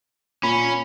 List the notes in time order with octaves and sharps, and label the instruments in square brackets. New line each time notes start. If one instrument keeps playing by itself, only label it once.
[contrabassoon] A#2 [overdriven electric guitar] C#4 [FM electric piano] B5